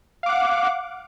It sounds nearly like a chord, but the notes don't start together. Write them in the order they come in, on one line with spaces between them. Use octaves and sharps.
F5 D6 F#5